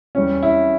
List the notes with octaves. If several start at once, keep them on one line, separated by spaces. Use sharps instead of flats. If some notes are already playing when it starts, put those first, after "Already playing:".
E2 E3 G3 C#4
E4